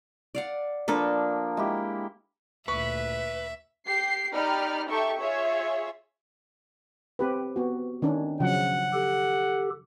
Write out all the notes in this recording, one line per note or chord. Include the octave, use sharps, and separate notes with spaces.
D5 F5 F#5
F3 A#3 D4 A4 B4
G#3 E4 G4
D2 A#2 B4 E5 C#6
G4 C7
D#4 G4 D5 B5 F6
D#4 G4 A4 E5 C#6
F4 G#4 C#5 E5
C4 G4 B4
B3 F#4
D#3 C#4 D4
C#3 F3 F#3 F#5
G4 A4